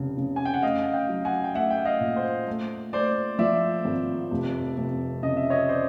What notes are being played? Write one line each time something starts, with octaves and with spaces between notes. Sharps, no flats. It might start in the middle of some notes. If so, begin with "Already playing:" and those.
Already playing: F1 C#3
C#3
G#5
G5
F#5
A3 D#5 F5
F5 G5
F#3
F#5 G#5
G5
A3 E5 F#5
G5
F#5
D#5 F5
A#2
C5
A3
A3 C5 D5
F3 D5 E5
G#1
F1
F1
C#3 D#5
E5
C#5 D#5
C5 D5